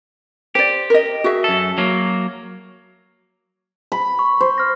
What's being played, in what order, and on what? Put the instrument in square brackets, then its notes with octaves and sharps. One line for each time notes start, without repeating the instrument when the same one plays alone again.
[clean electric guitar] G4 [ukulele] C5 D5
[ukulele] A#4 D#5
F#4 G#4 E5
[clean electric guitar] F#2 A4
F#3 A#3
[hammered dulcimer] B5
[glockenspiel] C#6
[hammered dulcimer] C5
[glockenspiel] F6 A#6